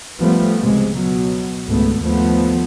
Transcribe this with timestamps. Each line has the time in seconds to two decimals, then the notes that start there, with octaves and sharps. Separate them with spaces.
0.19 F3 G3 A3 B3
0.63 C#2 C3 G#3
0.97 B2 F#3
1.66 G#1 C#2 G#2 A3 B3
2.03 D#2 F3 A3 B3